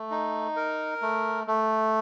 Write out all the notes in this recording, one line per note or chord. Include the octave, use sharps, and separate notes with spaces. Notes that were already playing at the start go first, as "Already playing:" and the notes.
Already playing: A3
D#4
A#4
A3
A3